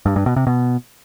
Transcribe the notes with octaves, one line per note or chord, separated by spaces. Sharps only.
G2
G2
B2
C3
B2